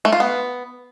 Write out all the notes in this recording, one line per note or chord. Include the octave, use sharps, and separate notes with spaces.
A3
F4
B3